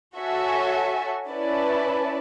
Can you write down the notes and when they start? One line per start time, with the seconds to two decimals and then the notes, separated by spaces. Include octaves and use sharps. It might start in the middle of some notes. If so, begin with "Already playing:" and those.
0.17 F#4 A4 C#5 E5 G#5
1.28 C#4 E4 B4 D5 A5